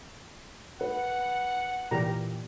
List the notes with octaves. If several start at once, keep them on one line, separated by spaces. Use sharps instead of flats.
B4 F#5
A#2 E3 G4 A#4 A#5